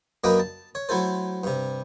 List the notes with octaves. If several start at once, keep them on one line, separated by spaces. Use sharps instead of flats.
F#2 A#3 D4 B4 D#5 G5
A5
C#5
F#3 A3 E4 A4 C5
G2 C3